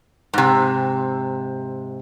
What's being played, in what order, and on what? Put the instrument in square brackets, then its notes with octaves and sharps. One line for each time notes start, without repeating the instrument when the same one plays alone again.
[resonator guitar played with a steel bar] G#2 C3